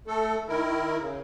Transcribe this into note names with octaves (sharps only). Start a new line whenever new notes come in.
A3 A4
D#3 E4 A#4
C#3